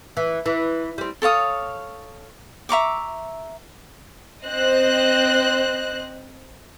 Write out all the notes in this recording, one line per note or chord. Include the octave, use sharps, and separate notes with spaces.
E3
E3
G3 C4
A4 C#5 F5 D#6
E5 A#5 C#6 D6
C4 C5 D#5 F#6